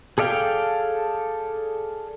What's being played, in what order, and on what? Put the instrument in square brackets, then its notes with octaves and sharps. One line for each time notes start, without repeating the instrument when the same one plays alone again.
[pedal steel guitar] G#4 A4 D5 F5 G5